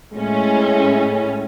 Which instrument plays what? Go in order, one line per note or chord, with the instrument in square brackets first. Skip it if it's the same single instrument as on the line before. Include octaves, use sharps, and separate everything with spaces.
[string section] A2 C#4 [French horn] G#3